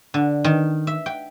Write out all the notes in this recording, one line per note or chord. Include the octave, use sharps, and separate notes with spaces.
D3
D#3
E5
G5